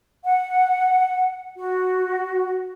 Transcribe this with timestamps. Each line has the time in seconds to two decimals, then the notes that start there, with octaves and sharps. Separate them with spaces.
0.24 F#5
1.57 F#4